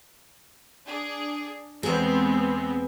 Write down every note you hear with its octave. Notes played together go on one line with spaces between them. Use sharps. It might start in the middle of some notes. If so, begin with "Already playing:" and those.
D4 G#4
E2 G#3 B3 C4 G#4